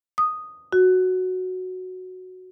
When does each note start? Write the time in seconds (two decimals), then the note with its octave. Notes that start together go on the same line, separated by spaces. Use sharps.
0.18 D#6
0.72 F#4